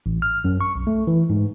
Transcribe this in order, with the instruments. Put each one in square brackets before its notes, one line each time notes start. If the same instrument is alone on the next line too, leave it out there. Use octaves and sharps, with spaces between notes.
[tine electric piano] A1
F6
F#2
C#6
B1
A3
E3
G#2